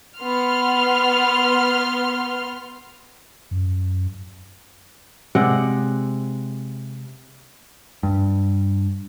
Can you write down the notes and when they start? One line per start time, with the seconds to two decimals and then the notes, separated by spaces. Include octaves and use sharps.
0.19 B3 C6 F6
3.51 F#2
5.35 C3 G#3 D5 F#5
8.03 G2